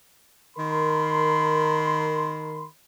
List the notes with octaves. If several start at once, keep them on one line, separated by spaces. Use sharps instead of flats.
D#3 A#4 B5 C6